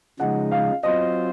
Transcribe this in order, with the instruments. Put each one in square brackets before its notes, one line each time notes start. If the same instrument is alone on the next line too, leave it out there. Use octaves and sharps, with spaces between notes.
[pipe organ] C#3 F3 G#3 D#4 [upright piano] F#5
[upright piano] F5
[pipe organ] F#3 C4 F4 C5 [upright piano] D#5